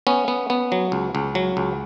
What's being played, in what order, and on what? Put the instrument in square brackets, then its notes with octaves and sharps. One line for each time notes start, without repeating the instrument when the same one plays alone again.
[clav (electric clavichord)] B3 C#4
B3
B3
F#3
C#2
C#2
F#3
C#2